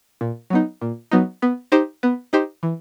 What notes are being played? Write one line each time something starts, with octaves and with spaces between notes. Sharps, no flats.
A#2
F#3 B3 D#4
A#2
F#3 B3 D#4
B3
D#4 G4 C5
B3
D#4 G4 C5
E3